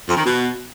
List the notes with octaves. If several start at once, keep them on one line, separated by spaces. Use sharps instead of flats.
F2
D#3
B2